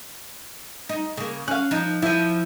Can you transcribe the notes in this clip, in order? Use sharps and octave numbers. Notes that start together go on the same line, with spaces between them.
D#4
C#3 A#3
C#4 F5 F#6
F3 D#4
F3 E4 D#7